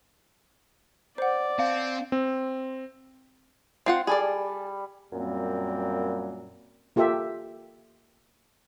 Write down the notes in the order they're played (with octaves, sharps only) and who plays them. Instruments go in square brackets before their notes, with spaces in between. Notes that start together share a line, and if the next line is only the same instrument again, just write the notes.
[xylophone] C5 F#5 [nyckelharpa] D5
[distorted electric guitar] C4 [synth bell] F5
[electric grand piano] C4
[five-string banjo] C4 F4 F#5
[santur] G3 [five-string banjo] G#4 A4 D5
[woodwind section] F#2 A#2 G3 A#3 C4
[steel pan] A#3 F4 G4 A4 E5